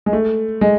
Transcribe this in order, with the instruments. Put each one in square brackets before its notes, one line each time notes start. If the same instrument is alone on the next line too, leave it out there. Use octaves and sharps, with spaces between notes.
[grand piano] G#3
A3
G#3